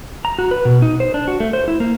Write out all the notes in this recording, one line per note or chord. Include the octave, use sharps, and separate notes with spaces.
A#5
F#4
B4
B2
D#4
C5
D4
F#4
A3
C5
E4
A#3